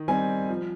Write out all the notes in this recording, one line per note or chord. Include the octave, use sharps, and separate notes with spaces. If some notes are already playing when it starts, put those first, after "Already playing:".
Already playing: D#3
G3 C4 D#4 G#5
F3